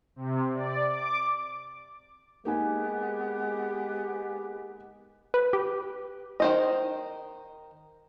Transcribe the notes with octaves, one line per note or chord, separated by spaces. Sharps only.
C3
D5
D6
G#3 A#3 B3 D#4 G4 G#5
B4
G4
D#3 C5 D#5